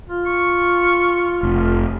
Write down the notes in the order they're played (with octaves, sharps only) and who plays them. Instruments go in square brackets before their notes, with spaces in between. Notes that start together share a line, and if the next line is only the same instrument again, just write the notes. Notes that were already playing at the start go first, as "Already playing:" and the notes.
[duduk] F4
[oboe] C#6
[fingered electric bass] F1